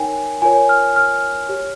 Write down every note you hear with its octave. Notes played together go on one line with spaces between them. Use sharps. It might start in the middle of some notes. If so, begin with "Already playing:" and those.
Already playing: D#4 A#4 C#5 G5 G#5
F4 A#4 C#5 G#5
F6
F6
G4 C#5